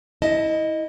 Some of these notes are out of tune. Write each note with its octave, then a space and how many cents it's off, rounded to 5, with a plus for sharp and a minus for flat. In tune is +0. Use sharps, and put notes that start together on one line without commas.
E4 -25 D#5 +0 A5 +0